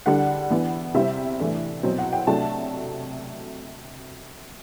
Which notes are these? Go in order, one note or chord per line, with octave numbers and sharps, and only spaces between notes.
D3 G3 D4 F#5
E3 B3 D4
C3 G3 C4 E5
A2 E3 A3 D4
B2 F#3 C4
F#5
G5
C3 F#3 A3 D4 A5